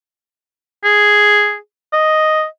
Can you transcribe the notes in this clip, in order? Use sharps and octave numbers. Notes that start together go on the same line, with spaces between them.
G#4
D#5